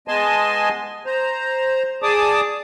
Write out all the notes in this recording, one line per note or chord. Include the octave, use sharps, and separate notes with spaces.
G#3 B3 D#5 G#5 A5 C6
C5 A#5
G#4 D5 A5 D6 D#6